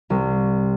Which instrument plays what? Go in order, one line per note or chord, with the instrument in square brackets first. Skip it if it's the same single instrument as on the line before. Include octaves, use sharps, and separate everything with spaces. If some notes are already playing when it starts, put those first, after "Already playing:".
[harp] C2